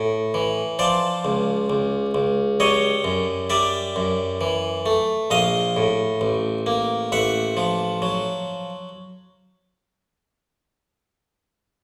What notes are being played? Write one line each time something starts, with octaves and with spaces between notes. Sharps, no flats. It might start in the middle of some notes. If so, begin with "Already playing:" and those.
Already playing: A2
E3
F3 C5 D5
C#2
C#2
C#2
G3 C#5 D#5
F#2
G3 D5 E5
F#2
E3
A3
A#1 D#5 F5
A2
A1
A#3
A1 E5 F#5
F3
F#3